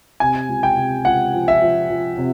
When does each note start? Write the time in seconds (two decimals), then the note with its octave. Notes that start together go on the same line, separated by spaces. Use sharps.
0.20 C3 G#5
0.49 C#2
0.63 G5
0.77 C3
1.05 C#2 F#5
1.34 F3
1.48 E5
1.62 F3
1.90 F3
2.18 C3